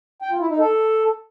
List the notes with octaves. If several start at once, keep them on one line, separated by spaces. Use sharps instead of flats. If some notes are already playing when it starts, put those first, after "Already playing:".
G5
F4
E4
D#4
A4